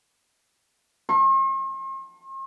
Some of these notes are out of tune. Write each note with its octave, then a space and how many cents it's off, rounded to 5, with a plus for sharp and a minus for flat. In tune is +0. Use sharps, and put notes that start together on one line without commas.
C6 +45